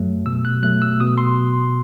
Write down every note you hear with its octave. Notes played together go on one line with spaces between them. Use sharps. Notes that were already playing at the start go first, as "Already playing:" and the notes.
Already playing: F#2 F#3 A3
B2 E6
F#6
F#3 A3 F#6
E6
B2 D#6
C6